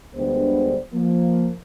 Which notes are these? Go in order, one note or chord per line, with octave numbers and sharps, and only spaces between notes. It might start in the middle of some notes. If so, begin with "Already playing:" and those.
D2 D3 G3 G#3 B3 C5
F3 A#3